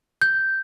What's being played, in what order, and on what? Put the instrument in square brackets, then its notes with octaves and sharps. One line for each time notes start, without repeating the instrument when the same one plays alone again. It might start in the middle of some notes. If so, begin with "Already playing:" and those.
[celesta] G6